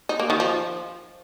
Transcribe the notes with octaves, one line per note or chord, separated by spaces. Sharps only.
D#4
A#3
D#3
F3